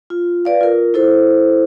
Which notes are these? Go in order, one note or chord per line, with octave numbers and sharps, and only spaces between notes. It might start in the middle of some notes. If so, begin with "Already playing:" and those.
F4
B4 D5 F5
F4 A#4
E4 A4 C5